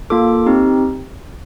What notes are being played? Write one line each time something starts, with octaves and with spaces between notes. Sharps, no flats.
A#3 F4 A4 D6
C4 D#4 G4